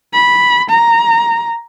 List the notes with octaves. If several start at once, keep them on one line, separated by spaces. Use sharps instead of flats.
B5
A#5